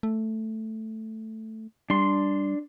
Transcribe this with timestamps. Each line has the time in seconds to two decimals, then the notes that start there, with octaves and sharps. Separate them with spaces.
0.03 A3
1.90 G3 D4 C6